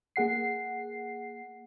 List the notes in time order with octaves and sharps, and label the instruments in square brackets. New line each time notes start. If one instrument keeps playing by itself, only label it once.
[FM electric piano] A#3 G#4 F#5 C7